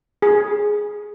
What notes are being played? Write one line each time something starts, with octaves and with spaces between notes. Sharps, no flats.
G#4